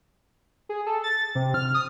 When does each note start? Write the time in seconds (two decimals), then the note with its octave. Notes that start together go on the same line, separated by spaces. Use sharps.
0.69 G#4
0.86 A4
1.04 A6
1.35 C3
1.54 F6
1.74 D#6